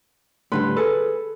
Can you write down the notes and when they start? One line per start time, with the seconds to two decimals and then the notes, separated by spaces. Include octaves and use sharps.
0.52 A2 D3 G3 B4 C6
0.77 G#4 A4 B4